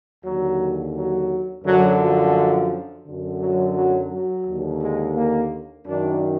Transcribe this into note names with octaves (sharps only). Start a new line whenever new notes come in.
D#2 D3 F#3
F#3
F#2 D3 F#3
F3
F#2 D3
F#3
F#3
F#3
D#2 D3
G#3
A#3
F#2 D#3 D4